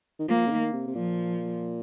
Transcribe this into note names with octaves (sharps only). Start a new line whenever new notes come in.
D#3
F3 A#3
C#3
D#3
C3
C3
A#2 F3